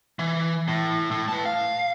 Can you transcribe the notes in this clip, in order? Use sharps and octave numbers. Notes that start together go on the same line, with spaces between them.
E3
A2
A2
B4 A5
F5